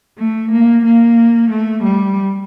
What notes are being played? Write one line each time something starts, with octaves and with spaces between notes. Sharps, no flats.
A3
A#3
A#3
A3
G3